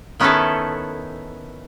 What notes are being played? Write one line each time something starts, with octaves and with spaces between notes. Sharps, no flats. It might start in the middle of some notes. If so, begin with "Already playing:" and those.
D#3 B3 C#4 D#4 E4 A4